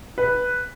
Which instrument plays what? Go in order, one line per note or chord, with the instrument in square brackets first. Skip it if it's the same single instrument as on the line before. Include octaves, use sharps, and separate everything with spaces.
[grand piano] B4